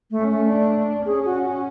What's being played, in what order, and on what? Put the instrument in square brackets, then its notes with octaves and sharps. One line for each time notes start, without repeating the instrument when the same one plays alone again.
[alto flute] A3
[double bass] C#4
[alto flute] A3
[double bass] D4
[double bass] C#4 [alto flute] G#4
[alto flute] F#4
F#4